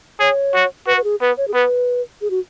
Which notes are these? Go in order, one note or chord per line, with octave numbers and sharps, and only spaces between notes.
G#4 C#5
F#4
F#4 B4
B4
G#4
B3 B4
C#5
G#4
B3 B4
G#4
F#4